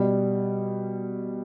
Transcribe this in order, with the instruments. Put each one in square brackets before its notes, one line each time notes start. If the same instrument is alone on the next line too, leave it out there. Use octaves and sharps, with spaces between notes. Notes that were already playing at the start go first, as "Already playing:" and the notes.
Already playing: [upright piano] B2 G3